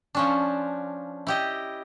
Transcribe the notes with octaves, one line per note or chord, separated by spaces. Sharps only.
F3 C#4 D4
E4 G4 D#5